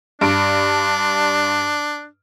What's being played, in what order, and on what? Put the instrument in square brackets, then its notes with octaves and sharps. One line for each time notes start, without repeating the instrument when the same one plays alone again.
[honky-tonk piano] G2 D7 [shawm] D4